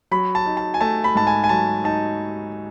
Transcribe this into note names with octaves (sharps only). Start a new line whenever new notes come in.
F#3 B5
A5
D#4
A5
G#5
A3 A5
B5
G#2 A5
G#5
G#5
F#3 A5
D#4 A5